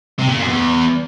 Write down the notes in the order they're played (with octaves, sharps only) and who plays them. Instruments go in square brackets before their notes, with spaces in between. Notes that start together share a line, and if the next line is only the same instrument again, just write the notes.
[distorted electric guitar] C3
A#2
F#2
E2